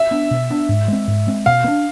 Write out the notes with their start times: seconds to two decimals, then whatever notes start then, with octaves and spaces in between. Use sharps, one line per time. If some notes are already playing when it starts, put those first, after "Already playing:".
Already playing: E5
0.11 B3 D4
0.31 B2
0.50 B3 D4
0.69 G#2
0.88 G#3 C4
1.08 G#2
1.27 G#3 C4
1.46 B2 F5
1.64 B3
1.68 D4